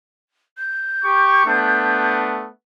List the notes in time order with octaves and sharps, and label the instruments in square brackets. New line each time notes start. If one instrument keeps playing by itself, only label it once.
[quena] G6
[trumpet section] G4 C#6
A3 B3 D4